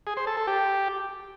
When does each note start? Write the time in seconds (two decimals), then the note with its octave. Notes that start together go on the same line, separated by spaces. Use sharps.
0.07 G#4
0.17 C5
0.27 A4
0.37 A4
0.47 G4